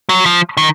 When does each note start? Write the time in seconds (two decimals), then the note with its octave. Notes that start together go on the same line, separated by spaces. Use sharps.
0.09 F#3
0.26 F3
0.57 D#3